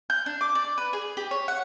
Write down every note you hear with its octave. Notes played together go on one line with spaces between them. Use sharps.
G6
D4
D6
D5
B4
G#4
G4
C#5
F#5